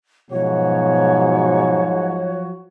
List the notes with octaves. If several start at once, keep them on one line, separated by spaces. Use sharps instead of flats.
G#2 B2 F3 F#3 F#4 C#5